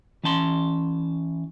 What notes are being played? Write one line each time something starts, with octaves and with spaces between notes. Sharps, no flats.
E3 C#4 A5 C6